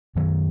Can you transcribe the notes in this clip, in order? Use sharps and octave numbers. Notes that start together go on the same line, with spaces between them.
F#2 D#3 F#3